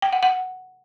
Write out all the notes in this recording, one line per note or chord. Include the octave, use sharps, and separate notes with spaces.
G5
F#5
F#5